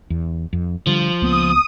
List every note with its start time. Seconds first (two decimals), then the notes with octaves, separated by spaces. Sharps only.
0.10 E2
0.53 F2
0.87 D3 F3 G3
1.22 C#2 A#3 B3 D#6